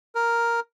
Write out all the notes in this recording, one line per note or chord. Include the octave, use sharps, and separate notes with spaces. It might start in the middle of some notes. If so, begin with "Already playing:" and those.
A#4